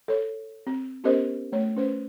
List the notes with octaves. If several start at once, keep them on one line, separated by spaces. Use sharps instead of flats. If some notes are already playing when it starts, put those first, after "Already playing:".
A4 C#5
C4
B3 C#4 G4 A#4 C5 D#5
A3 C#5
C#4 B4 C5